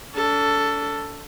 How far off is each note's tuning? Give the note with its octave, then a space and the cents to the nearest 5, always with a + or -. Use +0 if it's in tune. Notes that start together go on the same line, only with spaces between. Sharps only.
D4 -40 A4 +10